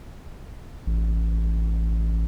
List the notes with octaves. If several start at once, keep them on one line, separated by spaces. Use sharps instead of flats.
A1